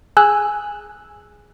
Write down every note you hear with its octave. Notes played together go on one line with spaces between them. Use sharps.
G#4 G#5 E6 F#6